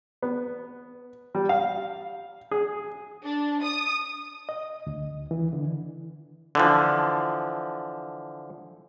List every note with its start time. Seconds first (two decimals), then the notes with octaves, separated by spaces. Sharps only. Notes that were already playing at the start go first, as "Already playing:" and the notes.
0.22 B3
1.35 G3
1.49 F5
2.51 G#4
3.24 D4
3.62 D#6
4.49 D#5
4.87 D2
5.31 E3
5.53 D3
6.55 D3 E3 F3